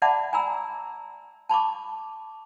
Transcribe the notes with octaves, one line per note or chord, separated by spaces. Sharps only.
D5 E5 F#5 A5 B5 D6
G#5 A#5 B5 E6
A5 B5 C#6 D6